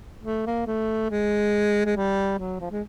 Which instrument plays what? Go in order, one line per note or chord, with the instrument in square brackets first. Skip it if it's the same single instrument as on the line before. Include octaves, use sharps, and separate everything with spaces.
[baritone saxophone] A3
A#3
A3
G#3
G#3
G3
F#3
F3
G#3